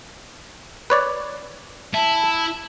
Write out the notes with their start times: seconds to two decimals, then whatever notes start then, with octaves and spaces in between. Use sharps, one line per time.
0.90 B4 C#5 D5
1.94 E4 A5